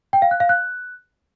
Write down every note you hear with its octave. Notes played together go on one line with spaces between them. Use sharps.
G5
F5
F#6
F5
F#6